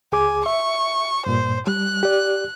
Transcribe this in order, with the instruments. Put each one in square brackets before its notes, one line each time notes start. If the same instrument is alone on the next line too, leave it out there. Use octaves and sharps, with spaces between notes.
[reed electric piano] C#2 G#4 D6 [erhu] G#5
[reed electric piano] E5 [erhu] C#6
[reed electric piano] G2 A#2 [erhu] C5
[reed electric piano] G3 [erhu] F#6
[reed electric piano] G4 D5